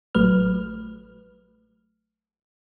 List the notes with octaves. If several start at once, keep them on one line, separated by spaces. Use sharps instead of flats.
A1 F#3 A3 B4 F6